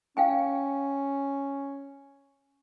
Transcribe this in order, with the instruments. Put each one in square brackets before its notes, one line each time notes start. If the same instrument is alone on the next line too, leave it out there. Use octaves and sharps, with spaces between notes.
[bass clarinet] C#4 [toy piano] F5 G5 G#5